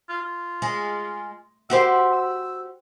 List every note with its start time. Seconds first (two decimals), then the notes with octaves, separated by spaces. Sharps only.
0.09 F4
0.22 F4
0.62 G#3
1.70 F#4 G4 C5 E5
2.12 E6